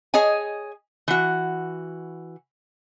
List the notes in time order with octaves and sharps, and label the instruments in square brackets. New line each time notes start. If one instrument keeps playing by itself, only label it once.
[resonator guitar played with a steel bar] G#4 C#5 D#5 G#5
E3 F#4